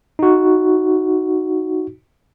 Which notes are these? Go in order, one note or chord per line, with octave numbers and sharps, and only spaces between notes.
D#4 F#4